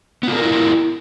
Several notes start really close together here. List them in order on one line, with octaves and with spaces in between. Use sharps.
B3 F4 A4 A#4 E4